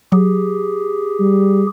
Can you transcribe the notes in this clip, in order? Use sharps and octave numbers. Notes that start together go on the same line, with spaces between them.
F#3 G4 G#4
G3